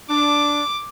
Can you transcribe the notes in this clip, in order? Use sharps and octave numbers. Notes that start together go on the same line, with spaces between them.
D4 D6